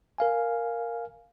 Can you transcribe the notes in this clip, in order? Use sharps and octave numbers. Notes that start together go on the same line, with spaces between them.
A#4 F5 G#5